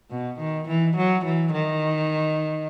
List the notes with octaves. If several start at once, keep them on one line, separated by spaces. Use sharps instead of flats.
B2
D#3
E3
F#3
E3
D#3